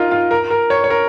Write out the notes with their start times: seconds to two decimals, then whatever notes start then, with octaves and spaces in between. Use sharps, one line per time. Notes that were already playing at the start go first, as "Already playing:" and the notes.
Already playing: D#4 F4 A#4
0.11 F4
0.31 A#4
0.50 A#4
0.70 C#5
0.84 C#5
0.90 A#4